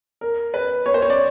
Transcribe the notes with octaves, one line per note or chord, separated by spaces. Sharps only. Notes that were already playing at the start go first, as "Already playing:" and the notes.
A#4
B4
C#5
C5
C#5
D5